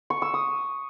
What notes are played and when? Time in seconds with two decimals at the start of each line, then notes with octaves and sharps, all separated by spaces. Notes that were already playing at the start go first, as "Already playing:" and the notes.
0.10 C#6
0.22 E6
0.34 D#6